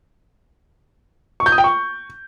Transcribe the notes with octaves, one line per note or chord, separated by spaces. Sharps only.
C#6
G6
D#6
G5
C#6